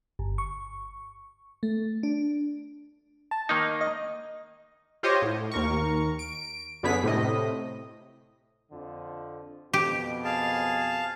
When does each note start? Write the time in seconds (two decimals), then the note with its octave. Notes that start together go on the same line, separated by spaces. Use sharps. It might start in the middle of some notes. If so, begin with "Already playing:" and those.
0.19 G1
0.38 C#6
1.63 A3
2.03 D4
3.31 A5
3.49 D#3 A#3 D#4 D#5
3.81 D#5
5.03 F4 G4 C5 C#5 D#5
5.22 A2
5.51 D#2 A#4 C#6
6.19 D7
6.83 F#2 D3 B3 G#4 B6
7.03 A2 C3 D#5
8.72 F2 D3 F3
9.74 F2 B2 G4
10.25 G#4 F5 A5